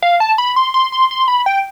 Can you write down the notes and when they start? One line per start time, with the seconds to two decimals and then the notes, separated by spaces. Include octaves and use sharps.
0.02 F5
0.20 A5
0.38 B5
0.56 C6
0.74 C6
0.92 C6
1.11 C6
1.28 B5
1.46 G5